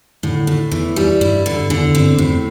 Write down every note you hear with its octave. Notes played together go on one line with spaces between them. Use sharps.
A2 D3
A2
E2 E3
G3
G2 E4
D3
E2 D3
G2 C4
E2 A2